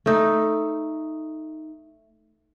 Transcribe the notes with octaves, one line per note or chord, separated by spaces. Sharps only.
A3 D#4